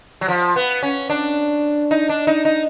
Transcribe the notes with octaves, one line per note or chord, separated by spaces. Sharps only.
F#3
F3
B3
C#4
D4
D#4
D4
D#4
D#4